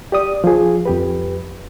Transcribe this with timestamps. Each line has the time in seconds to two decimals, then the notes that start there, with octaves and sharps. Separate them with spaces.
0.12 G4 D5 D#6
0.44 F3 G#4
0.86 F2 G4 B4